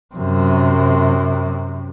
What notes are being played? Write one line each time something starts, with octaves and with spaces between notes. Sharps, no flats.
F#2 C3